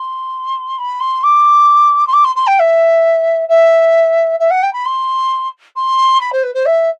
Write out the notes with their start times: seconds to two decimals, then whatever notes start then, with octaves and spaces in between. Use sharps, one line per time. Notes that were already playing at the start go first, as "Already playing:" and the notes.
Already playing: C6
0.78 B5
1.00 C6
1.23 D6
2.07 C6
2.13 D6
2.24 C6
2.35 C6
2.47 G5
2.59 E5
3.49 E5
4.39 E5
4.50 F#5
4.62 G5
4.73 B5
4.85 C6
5.76 C6
6.20 B5
6.32 C5
6.43 B4
6.54 C5
6.66 E5